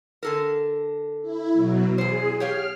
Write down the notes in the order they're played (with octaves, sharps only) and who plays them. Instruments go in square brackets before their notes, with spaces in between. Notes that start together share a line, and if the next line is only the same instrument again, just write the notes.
[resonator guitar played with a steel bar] D3 A4 A#4
[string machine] E4
B2 F#3
[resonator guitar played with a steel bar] E2 C5 [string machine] G#4
[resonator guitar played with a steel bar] G4 C#5 F5 [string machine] F6